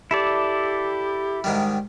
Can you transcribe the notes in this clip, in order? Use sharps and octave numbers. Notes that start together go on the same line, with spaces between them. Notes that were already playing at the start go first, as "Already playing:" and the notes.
E4 G4 A4 D5
G#2 D#3 G3